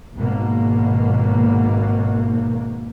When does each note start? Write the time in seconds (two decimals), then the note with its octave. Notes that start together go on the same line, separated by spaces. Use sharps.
0.15 G#1 B2 A#3